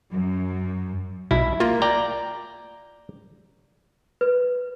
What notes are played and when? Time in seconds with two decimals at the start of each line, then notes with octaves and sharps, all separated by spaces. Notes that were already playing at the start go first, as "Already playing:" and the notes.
0.14 F#2
1.31 B1 B2 E4
1.60 A#3 F4
1.82 D5 G5 A#5
4.21 B4